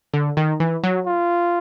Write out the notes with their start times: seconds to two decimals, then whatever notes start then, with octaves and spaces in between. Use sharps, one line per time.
0.13 D3
0.37 D#3
0.60 E3
0.83 F#3
1.06 F4